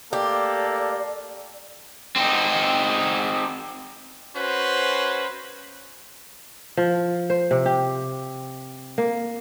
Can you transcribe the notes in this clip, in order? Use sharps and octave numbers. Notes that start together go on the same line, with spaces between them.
A3 A#3 G4 A4 D5
C4 D#4
C#4 F#4 B4 C5
F3
C5
C3
G4
A#3